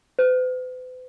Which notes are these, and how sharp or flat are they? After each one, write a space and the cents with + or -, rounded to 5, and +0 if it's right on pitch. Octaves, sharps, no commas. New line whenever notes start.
B4 +45